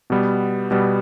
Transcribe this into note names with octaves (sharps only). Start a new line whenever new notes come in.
B2 G3 B3
B2 G3 B3